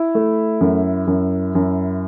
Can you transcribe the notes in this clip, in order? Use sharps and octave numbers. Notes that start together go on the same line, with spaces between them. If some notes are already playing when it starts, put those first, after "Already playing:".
Already playing: E4
A3
F#2
F#2
F#2